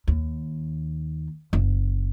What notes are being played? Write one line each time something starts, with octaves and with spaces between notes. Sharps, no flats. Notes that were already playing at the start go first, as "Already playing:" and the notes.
D#2
F#1